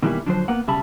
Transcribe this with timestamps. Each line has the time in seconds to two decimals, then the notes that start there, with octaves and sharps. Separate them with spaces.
0.02 B2 D#3 E3 G3 A#3 E4
0.26 D3 F3 F#3 C5
0.48 A#3 B3 F#5
0.67 B1 C#3 G3 E5 A5 B5